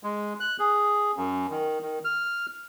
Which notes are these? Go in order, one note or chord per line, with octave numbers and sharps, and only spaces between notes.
G#3
F#6
G#4
F#2
D#3
D#3
F6